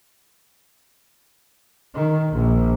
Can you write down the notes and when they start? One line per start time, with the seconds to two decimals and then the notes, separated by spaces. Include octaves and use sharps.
1.95 D#3
2.32 A#1